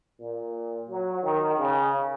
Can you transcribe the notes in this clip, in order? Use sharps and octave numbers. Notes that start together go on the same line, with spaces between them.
A#2
F#3
D#3
C#3